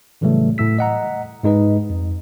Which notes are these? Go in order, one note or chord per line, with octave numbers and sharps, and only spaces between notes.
A2 C#3 E3 F#3 G3 A3
A2 A3 E6 B6
D#5 F#5 A#5
G#2 G#3 D#4 B4 D#5
F2